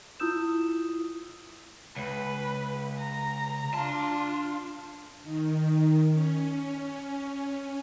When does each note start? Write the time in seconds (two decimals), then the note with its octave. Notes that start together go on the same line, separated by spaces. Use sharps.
0.20 E4 F4 D#6 E6 G6 E7
1.96 C#2 B4
2.99 A#5
3.74 D4 F4 A5
5.23 D#3
6.12 C#4